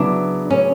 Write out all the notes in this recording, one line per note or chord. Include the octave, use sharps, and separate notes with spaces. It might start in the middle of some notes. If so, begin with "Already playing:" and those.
Already playing: C#3 F#3 B3 D4 E4
C#4